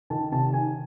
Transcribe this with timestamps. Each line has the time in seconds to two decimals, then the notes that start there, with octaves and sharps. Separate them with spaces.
0.10 D#3 A5
0.32 C3 A5
0.53 D#3 G#5